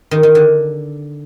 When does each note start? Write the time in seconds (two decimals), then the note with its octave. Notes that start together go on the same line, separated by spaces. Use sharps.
0.11 D#3
0.23 D#3
0.35 D3